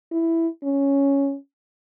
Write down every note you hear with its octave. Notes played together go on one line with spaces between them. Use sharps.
E4
C#4